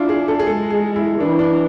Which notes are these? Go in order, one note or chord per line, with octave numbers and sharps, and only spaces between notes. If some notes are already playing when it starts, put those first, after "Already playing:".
Already playing: D4 E4 F4
G#4
A4
G#4
G#3 A4
G#4
E4
E3 D4
D4